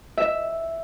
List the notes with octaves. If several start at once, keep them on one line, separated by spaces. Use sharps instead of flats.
E5